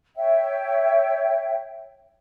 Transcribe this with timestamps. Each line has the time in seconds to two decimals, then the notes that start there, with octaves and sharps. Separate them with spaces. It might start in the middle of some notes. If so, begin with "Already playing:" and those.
0.16 C#5 E5 G5